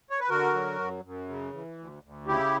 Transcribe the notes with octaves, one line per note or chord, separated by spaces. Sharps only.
C#5
B4
D3 F#4 A#4
F#3
F#2
F#2
C#3
E3
D2
D2
C#3 E4 G4